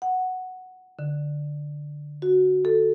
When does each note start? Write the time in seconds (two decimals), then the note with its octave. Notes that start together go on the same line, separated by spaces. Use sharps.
0.02 F#5
0.99 D3
2.22 F#4
2.65 A4